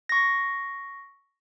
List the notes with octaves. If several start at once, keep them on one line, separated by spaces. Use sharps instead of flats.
C#6 A#6